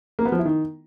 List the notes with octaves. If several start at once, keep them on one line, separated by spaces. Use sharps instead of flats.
A#3
B3
F3
E4
D#3